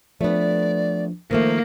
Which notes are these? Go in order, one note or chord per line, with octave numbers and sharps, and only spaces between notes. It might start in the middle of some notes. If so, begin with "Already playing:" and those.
F3 A3 B3 D4 D5
D#3 F3 A3 A#3 C5